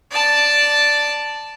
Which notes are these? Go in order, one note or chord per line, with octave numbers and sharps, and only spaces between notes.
D5 A5